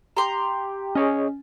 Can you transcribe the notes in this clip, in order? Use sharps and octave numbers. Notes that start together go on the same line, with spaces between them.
G4 A#5 C6
C#4 G#4 C#5 D#5